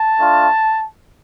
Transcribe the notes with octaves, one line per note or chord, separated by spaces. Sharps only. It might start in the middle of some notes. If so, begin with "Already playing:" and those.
Already playing: A5
A3 D4 F4